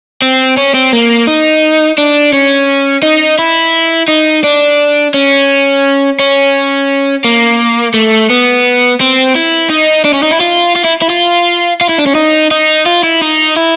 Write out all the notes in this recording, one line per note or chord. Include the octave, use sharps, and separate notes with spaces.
C4
C#4
C4
A#3
D#4
D4
C#4
D#4
E4
D#4
D4
C#4
C#4
A#3
A3
B3
C4
E4
D#4
D4
C#4
D#4
E4
F4
F4
E4
E4
F4
F4
E4
D4
C#4
D#4
D#4
F4
E4
D#4
E4